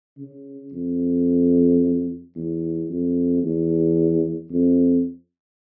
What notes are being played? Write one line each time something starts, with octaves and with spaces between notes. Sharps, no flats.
C#3
F2
E2
F2
E2
F2